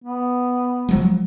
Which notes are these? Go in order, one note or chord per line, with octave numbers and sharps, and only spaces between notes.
B3
F3 F#3 G#3